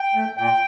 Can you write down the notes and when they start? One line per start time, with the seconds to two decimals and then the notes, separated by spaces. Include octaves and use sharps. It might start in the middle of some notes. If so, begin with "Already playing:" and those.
Already playing: G5
0.15 A3
0.37 A#2 G5